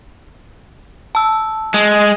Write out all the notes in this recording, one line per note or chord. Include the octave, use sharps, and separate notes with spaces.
A5 E6
G#3